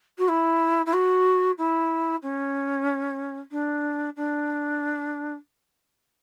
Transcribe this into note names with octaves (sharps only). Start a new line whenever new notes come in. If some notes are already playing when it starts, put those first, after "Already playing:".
F#4
E4
E4
F#4
E4
C#4
D4
D4